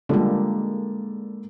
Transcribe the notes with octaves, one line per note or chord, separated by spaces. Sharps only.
D3 F3 G3 G#3 A#3